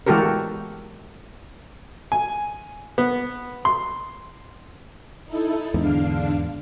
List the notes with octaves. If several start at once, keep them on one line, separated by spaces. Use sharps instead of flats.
E3 G#3 F#4 G4 A4 A#4
G#5
B3
C6
D#4 E4 A4
E2 G#2 D3 D4 F5